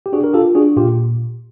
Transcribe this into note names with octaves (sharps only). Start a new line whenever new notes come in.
G4
D4 F#4 G#4
A#4
F4 G4 A4
D4 F#4 G#4
A#2 F4 G4